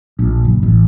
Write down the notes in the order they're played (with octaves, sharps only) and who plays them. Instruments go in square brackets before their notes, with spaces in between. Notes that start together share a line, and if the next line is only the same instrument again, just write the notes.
[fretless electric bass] A#1
F#1
A1